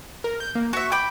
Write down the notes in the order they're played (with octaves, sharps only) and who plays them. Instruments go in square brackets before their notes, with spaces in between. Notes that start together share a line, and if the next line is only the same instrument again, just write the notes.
[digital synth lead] A#4
G6
A#3
[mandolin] F#4 E5 [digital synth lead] C#6
[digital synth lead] G5 [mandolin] B5 D6 G6